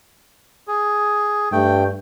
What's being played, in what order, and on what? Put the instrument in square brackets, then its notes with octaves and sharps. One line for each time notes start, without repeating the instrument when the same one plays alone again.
[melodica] G#4
[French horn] G2 [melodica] A3 G5